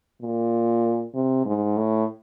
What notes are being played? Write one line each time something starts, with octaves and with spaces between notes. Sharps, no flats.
A#2
C3
G#2
A2